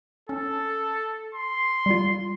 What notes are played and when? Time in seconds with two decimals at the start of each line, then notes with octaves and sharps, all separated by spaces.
0.29 C#4 A4
1.35 C6
1.86 G3 F4